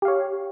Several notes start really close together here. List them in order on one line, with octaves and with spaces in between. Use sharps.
G4 F5 C#5